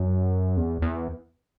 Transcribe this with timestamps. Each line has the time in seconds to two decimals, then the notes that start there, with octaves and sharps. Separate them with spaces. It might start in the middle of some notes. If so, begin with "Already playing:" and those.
Already playing: F#2
0.57 E2
0.82 E2